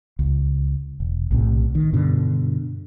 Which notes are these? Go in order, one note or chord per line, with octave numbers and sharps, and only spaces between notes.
C#2
E1
B1 A2 C3
D#3
G2 B2 D3